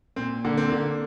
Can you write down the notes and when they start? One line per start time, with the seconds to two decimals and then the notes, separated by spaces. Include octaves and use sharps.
0.16 A#2 C4
0.45 D3 A#3
0.57 C4
0.69 D3 A#3